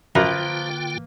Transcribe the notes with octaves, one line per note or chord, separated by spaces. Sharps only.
F#2 D3 F3 A#3 F4 B4 G5 A#5